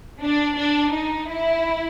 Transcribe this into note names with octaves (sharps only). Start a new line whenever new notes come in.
D4
D4
D#4
E4